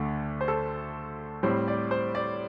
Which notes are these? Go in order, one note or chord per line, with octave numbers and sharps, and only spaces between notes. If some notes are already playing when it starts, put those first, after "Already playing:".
Already playing: D2 D3 A3
C5
A4
A2 G3 C4 C5
D5
C5
D5